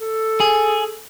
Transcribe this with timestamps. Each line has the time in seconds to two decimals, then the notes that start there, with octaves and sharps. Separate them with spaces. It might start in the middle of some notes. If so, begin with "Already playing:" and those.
0.01 A4
0.40 G#4